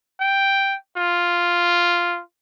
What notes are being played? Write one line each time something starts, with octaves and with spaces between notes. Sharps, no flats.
G5
F4